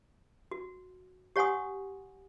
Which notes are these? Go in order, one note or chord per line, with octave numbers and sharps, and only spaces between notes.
F#4
G4 C#5 F#5 G#5 C6 D#6